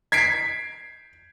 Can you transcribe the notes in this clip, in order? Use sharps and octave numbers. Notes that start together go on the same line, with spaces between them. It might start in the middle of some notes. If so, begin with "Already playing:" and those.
G#6 B6 C7 D7